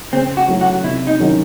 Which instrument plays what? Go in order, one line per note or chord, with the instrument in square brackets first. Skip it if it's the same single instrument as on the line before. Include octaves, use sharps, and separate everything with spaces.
[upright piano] C#3 [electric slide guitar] C4
[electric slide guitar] F#4
[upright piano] F#3 A3 C#4 E4
[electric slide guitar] F#4
[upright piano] C3 [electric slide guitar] E4
[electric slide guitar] D#4
[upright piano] D#3 F#3 C#4 E4